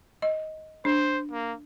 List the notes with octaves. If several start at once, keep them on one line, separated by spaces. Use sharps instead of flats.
D#5
D4 C5
A#3